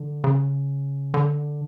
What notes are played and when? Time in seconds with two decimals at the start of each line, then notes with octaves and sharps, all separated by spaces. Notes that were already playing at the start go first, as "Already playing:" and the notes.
Already playing: D3
0.24 C#3
1.14 D3